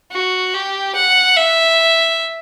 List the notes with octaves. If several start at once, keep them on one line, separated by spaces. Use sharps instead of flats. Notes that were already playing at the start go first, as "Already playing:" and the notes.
F#4
G4
F#5
E5